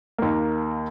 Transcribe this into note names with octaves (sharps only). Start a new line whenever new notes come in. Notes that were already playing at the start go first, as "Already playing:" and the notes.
D#2 A#3